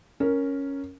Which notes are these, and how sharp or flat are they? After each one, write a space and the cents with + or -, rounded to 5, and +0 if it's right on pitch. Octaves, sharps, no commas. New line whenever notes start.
C#4 +0 A#4 +0